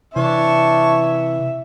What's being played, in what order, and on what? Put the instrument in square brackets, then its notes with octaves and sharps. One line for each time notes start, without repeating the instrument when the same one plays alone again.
[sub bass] C3 [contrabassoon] E3 [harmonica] D4 C#5 A5 [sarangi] E5